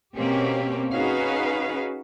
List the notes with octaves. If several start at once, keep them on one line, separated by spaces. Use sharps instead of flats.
B2 A#3 C4 C#4 G4
C#4 D#4 F#4 G#4 B4 F5